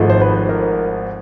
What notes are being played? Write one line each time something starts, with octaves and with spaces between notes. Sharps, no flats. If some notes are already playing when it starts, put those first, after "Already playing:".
Already playing: G#1 G#2 F3 A3
C5
B4
A#4